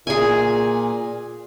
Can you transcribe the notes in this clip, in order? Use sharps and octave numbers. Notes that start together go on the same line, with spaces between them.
A#2 G#4 G#5